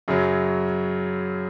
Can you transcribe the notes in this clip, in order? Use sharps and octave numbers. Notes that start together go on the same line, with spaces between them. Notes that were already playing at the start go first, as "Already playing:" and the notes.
F#2 C#3 F#3